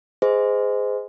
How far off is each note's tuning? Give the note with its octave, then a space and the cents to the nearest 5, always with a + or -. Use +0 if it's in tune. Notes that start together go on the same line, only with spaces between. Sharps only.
G#4 -5 C5 -25 D#5 +5